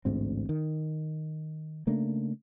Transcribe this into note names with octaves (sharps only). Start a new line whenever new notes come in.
A1 D2 G#2 C4
D#3
C#3 A3 A#3 D4